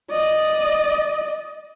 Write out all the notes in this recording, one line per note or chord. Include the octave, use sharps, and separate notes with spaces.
D5 D#5